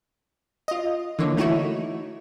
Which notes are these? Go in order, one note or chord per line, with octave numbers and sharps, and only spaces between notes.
F4 D#5
D3 E3 A#3 C#5
A3 D#4 E4 F#4 C#5